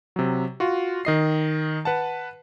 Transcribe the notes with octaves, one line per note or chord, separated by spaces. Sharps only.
C3 F#3
F4 F#4
D#3 D#5 C7
B4 F#5 A5